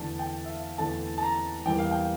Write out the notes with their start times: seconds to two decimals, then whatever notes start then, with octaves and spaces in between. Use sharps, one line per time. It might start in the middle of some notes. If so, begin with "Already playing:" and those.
Already playing: E2 D3 A3 A5
0.19 G5
0.44 E5
0.49 F5
0.78 E2 D3 A3 A5
1.18 A5
1.23 A#5
1.66 E2 E3 G3 A#3 G5
1.78 F5
1.91 G5